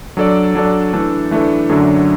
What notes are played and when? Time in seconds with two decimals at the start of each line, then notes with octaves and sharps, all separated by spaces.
0.17 F#3 D4 A4 D5
0.55 F#3 D4 A4 D5
0.93 E3 A3 D4 A4
1.31 E3 A3 D4 A4
1.69 F#2 D3 F#3 A3 D4